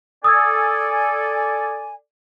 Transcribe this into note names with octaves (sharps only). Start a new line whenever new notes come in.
A4 D5 G#5 D#6 E6 G#6